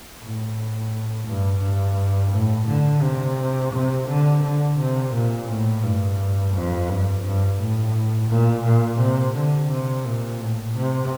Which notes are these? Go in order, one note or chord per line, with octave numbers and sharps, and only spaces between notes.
A2
G2
G2
A2
D3
C3
C3
D3
D3
C3
A#2
A2
G2
F2
G2
G2
A2
A#2
A#2
C3
D3
C3
A#2
A2
C3